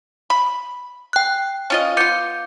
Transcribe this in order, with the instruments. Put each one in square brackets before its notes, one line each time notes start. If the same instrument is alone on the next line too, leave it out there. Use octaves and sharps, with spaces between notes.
[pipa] B5
[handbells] G5 F#6
[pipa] C#4 F4 D#5
[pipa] B3 F4 [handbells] D6 G6 C#7